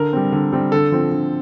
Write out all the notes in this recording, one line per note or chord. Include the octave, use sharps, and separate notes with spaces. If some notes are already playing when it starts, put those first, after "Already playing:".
Already playing: D3 A#4
G3 C4
D3
G3 C4
D3 A4
F3 C4
D3